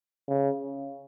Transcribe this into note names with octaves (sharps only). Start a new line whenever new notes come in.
C#3